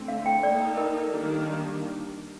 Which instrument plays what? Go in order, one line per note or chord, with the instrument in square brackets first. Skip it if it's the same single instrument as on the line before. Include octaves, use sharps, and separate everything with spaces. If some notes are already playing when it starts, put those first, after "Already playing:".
Already playing: [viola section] D3 A3 C4
[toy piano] F5
G5
[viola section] A#3 D#4 A4 [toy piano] D5
[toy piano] A#4
[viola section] D#3 G3 A#3 D4